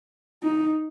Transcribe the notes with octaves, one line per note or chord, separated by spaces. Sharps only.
D#4